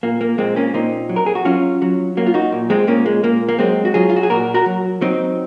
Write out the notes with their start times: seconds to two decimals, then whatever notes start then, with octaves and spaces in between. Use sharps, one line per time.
0.03 A#2 A#3
0.21 A#3
0.38 A#2 G#3 C4
0.56 A#3 C#4
0.74 A#2 C4 D#4
1.09 F#3
1.16 A#4
1.26 G#4
1.35 F#4
1.45 F#3 C#4 F4
1.82 F#3
2.17 F#3 A#3
2.26 F4
2.34 D#4 F#4
2.52 A#2
2.70 G#3 C4
2.87 A#2 A#3 C#4
3.06 G#3
3.23 A#2 A#3
3.49 A#3
3.59 F#3 G#3 C4
3.85 F#4
3.94 F#3 F4 G#4
4.10 F4
4.16 F#4
4.23 G#4
4.30 A#2 F#4 A#4
4.54 F#4 A#4
4.66 F#3
5.01 F#3 C4 D#4